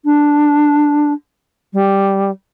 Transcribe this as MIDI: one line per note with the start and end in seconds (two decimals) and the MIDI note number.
0.05 1.13 62
1.73 2.31 55